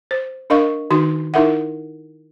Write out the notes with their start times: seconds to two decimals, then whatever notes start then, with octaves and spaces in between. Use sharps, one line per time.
0.11 C5
0.50 D4 A#4 D#5 F5 C#6
0.91 D#3 D#4 F#4 C6
1.34 D#4 E4 A#4 E5 F#5